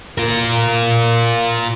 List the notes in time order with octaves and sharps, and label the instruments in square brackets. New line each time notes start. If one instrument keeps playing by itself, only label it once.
[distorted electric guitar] F4 A#4